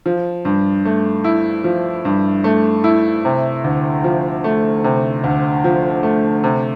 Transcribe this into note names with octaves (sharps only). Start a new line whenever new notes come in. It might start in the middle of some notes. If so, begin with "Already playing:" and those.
F3
G2
A3
E4
F3
G2
A3
E4
C3
D2
F3
A3
C3
D2
F3
A3
C3